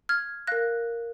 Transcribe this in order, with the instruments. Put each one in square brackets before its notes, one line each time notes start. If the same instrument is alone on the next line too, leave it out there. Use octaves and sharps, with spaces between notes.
[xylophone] F6 G#6
A#4 F5 F#6 A#6